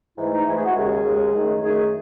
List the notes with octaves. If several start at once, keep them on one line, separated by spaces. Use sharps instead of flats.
G#2 E3 A3 E4
D#4
G#2 E3 A3 E4
G#4
F#4
D#2 C#3 G#3 G#4
D#2 C#3 G#3
F#2 D#3 A3
F#2 D#3 A3 G#4